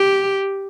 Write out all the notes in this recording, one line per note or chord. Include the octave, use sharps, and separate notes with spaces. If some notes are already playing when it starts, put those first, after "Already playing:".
Already playing: G4